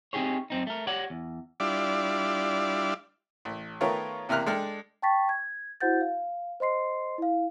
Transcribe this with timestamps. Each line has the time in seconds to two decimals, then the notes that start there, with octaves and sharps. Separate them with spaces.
0.13 C4 D#4 G4 G#4 C#5
0.50 F#2 C4 D#4
0.67 A3 A#4
0.87 G4 C#5 D5 F#5
1.10 E2
1.60 G3 D4 E4 F4 D5
3.45 A1
3.81 D#3 A3 B3 F4 A#4 C#5
4.29 E2 C3 A#3 F6 F#6
4.46 G#3 D4 A4 G5 F6
5.02 G5 A5 C#6 A6 B6
5.29 G#6
5.81 E4 F#4 C5 F#5 G6 A6
6.01 F5
6.60 C5 D#5 C6 C7
7.18 E4 F5